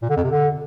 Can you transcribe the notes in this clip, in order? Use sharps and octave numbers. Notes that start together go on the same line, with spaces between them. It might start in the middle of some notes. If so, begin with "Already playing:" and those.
A#2
D3
F2
C3
D3